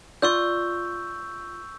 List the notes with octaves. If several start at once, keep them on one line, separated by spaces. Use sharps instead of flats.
F4 D5 C#6 E6 G6